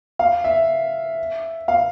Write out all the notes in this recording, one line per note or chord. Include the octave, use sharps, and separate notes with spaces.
F5
E5
F5